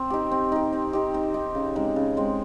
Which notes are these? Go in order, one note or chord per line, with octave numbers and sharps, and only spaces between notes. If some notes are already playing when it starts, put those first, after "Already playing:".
Already playing: C4
D#4 G4
C4
D#4 G4
C4
D#4 G4
C4
D#4 G4
C#3
G#3 C4 D#4
C#3
G#3 C4 D#4